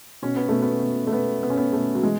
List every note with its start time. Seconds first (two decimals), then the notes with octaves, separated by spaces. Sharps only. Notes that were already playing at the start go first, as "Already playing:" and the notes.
0.22 B2 C#4
0.36 B3
0.49 B2 A3
0.62 B3
0.83 B2
1.07 A3
1.12 B2 B3
1.43 B2 B3
1.50 C#4
1.58 B3
1.73 B2 A3
1.95 F#3
2.03 E3 G#3